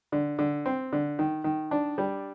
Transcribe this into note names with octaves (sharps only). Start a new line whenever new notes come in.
D3
D3
C4
D3
D#3
D#3
D4
G3